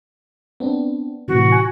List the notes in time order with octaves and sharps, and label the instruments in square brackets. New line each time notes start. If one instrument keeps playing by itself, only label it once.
[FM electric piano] B3 C4 D4
[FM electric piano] A2 C3 E3 [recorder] F#4
[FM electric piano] G#5